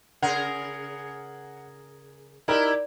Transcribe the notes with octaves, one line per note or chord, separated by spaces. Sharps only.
C#3 G#4 A#4 F#5
D#4 E4 G4 A#4 D5